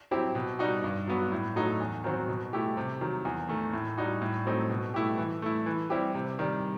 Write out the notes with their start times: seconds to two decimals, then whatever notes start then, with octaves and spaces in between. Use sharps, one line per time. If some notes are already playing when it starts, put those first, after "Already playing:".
0.11 F#3 C4 E4 G4
0.35 B2
0.59 G3 D#4 F#4
0.84 G2
1.08 F#3 B3 F#4
1.32 A2
1.56 F#3 A3 D#4 F#4
1.80 E2
2.04 D#3 F#3 C4 F#4
2.28 B2
2.53 A3 E4 G4
2.77 C3
3.01 D#3 F#3
3.25 E2
3.49 D#3 A3
3.73 A2
3.98 G3 D#4 F#4
4.22 A2
4.46 F#3 A3 C4 D#4
4.70 B2
4.94 A3 E4 G4
5.18 E3
5.42 A3 E4
5.66 E3
5.90 G3 C4 E4 G4
6.14 C3
6.39 D#3 G3